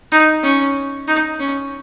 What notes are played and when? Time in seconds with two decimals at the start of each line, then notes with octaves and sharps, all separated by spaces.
0.11 D#4
0.43 C#4
1.08 D#4
1.40 C#4